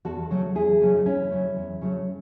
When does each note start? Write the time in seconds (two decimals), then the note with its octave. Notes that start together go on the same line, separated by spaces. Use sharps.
0.05 E2 F#4 A4
0.30 C#3 F#3 A3
0.55 E2 E4 G#4
0.81 C#3 F#3 A3
0.96 D#4
1.06 E2 C#4 E4
1.31 C#3 F#3 A3
1.56 E2
1.81 C#3 F#3 A3